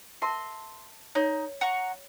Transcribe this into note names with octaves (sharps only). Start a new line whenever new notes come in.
A#4 E5 A5 C6
D#4 C#5
F#5 A#5 C#6